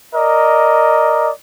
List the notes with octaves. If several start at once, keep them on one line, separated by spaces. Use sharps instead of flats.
A#4 D5 D#5